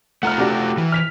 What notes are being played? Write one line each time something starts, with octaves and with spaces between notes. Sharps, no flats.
A3 F4 A4 F#5 A#5 F6
C3 D4 F#4
E3
F6 B6 F7